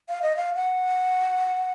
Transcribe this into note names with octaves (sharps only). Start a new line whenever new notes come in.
F5
D#5
F5
F#5